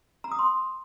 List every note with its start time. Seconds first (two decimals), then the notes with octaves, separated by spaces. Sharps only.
0.24 A#5
0.32 D#6
0.39 C6